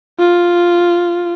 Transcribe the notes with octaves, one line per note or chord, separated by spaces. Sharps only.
F4